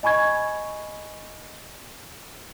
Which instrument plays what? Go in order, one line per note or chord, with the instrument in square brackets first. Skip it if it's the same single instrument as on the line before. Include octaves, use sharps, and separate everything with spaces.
[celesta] D#5 G#5 B5 C#6 G#6